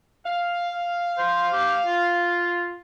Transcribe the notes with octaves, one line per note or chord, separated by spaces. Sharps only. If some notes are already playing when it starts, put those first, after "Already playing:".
F5
C5
G4
F4